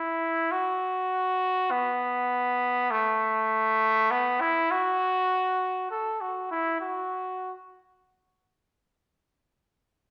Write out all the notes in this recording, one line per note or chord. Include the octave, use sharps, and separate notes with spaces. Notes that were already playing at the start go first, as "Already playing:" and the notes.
Already playing: E4
F#4
B3
A3
B3
E4
F#4
A4
F#4
E4
F#4